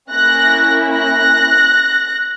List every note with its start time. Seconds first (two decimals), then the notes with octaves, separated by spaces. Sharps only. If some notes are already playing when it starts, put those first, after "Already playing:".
0.11 A#3 C#4 E4 F#6 A#6
0.95 F#6 A#6